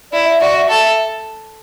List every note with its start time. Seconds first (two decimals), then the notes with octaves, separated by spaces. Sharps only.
0.12 E4 D5
0.26 E5
0.41 F#4 D5
0.54 E5
0.69 A4 E5